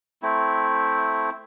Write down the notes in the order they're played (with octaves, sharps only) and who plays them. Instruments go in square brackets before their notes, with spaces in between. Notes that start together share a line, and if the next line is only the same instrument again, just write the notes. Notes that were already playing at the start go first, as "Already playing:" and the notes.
[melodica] A3 C4 E4